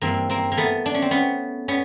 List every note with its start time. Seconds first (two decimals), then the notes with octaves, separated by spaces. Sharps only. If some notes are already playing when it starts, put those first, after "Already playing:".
0.02 G2 E3 A#3 C4
0.30 A#3 C4
0.52 A#3
0.57 A3 B3
0.86 D4
0.94 C#4
1.02 C4
1.11 B3 C#4
1.68 B3 C#4